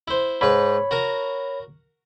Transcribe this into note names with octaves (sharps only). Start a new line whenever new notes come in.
E4 C5
G#2 B4 C#5 B5 C#6
F#4 A#4 A#5